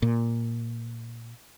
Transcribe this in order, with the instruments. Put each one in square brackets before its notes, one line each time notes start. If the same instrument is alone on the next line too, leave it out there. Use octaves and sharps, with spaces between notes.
[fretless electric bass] A#2